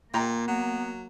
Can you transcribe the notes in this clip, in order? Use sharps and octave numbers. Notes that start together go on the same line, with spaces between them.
A#2 A#3 G5 A#5
F#3 B3